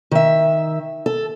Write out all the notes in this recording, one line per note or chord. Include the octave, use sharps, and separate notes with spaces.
D#3 E5
A4